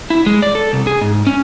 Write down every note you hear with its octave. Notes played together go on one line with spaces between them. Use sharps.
E4
G#3
D5
A4
C2
G#4
G#2
C#4